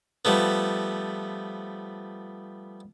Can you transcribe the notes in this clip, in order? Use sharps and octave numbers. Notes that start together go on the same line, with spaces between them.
F3 G3 A3 B3